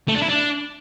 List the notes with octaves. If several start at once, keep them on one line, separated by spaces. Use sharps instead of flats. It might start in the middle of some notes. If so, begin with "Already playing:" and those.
A3
D4
E4
D4